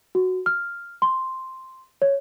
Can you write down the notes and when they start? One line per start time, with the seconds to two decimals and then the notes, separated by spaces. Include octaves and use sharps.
0.15 F#4
0.46 F6
1.02 C6
2.02 C#5